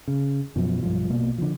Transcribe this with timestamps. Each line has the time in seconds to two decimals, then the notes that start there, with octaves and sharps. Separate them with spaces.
0.08 C#3
0.56 F#2 B2 F3
0.83 B1 G2 F3
1.09 A#1 B2 A#3
1.38 D3 F3